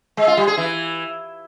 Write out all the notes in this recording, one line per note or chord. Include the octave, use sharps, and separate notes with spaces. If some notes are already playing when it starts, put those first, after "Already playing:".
G#3
F4
G3
G#4
E3